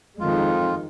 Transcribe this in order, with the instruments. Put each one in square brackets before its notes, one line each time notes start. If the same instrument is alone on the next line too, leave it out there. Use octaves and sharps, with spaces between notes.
[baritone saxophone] F2 [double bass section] D#3 G#3 [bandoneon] F4